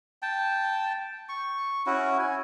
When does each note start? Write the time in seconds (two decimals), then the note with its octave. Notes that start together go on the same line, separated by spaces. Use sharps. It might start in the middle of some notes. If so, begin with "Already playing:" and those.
0.22 G5 A5
1.29 C#6
1.86 C#4 E4 F#4
2.19 G#5